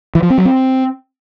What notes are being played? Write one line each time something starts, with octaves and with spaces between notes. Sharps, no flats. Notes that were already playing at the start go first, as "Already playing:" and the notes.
E3
F3
C4
F#3
C4